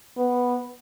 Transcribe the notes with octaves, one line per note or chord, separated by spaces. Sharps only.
B3